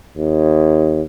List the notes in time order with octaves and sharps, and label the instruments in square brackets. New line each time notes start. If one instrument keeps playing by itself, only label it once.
[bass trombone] D#2